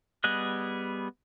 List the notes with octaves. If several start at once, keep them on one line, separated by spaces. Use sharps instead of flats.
G3 B3 G#4 D#5 F#6